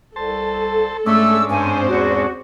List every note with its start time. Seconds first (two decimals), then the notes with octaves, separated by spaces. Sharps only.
0.16 C2 A4 C5 A5
1.06 G#2 A3 C#4 D4 E6
1.49 G2 C4 C5 G#5
1.88 E2 F#4